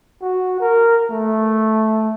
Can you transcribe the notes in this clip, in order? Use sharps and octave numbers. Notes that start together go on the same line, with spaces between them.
F#4
A#4
A3